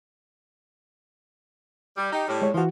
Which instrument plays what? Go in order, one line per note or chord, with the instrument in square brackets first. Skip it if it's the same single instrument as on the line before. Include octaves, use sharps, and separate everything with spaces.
[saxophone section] G3
D#4 G4
A2 G3
[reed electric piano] G#3 C#5
[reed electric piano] E3 F#4 [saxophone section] F3